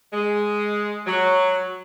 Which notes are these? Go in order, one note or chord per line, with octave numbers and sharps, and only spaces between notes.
G#3
F#3